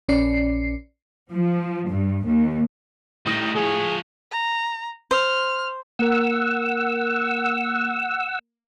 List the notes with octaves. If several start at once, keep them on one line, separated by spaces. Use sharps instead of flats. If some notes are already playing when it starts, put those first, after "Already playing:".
A#1 C#4 D5 C7
F3
G2
D#2
A2 G3 D#4 D#6 A#6
F3 G#4 C#5
A#5
C5 F6
A#3 A#4 F#5 E6